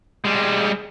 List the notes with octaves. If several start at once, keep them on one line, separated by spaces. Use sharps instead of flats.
G3 G#3